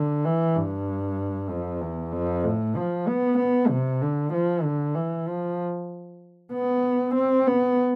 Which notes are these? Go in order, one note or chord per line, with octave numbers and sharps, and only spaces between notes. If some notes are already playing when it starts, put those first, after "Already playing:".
Already playing: D3
E3
G2
F2
E2
F2
A2
F3
B3
B3
C3
D3
F3
D3
E3
F3
B3
C4
B3